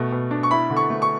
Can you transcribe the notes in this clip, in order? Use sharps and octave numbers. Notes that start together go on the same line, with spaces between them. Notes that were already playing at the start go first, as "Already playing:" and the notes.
Already playing: B2 A3
B2
D4
C#6
E4 B5
D3
C#6
A3
C#6